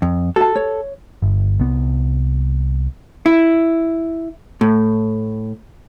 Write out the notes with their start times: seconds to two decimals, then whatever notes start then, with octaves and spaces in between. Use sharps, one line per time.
0.02 F2
0.36 F#4 A4 A5
0.55 C#5
1.22 G1
1.59 C2 B3
3.26 E4
4.61 A2